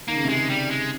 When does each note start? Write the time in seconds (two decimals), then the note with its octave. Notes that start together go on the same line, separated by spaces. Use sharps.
0.08 D#3 A#3
0.16 C#3
0.25 C3
0.29 C#3 G#3
0.50 G3
0.71 G#3